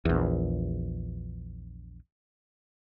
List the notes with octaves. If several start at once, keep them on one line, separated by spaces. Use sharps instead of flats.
A#1 E2